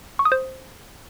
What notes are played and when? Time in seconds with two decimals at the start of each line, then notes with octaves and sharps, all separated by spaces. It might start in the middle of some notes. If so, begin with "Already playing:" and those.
0.19 C#6
0.25 D#6
0.32 C5